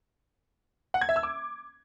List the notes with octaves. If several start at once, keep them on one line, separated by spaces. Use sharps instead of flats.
F#5
G#6
E5
E6
D6